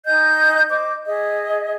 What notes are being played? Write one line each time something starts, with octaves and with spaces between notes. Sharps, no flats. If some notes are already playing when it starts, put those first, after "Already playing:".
D#4 D#5 G#5 G6
C5 D#5 D6
G#4 D#5 E5